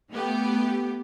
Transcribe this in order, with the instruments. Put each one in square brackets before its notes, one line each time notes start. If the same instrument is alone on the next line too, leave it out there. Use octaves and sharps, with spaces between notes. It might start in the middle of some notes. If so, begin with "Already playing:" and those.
[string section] A3 B3 G4